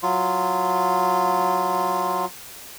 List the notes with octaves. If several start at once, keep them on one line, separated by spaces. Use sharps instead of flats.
F#3 F4